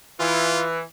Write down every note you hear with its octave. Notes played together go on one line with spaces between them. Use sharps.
E3 F4